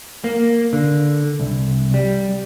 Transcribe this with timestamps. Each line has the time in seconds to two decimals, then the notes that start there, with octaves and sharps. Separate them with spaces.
0.24 A#3
0.73 D3
1.40 C2
1.94 G3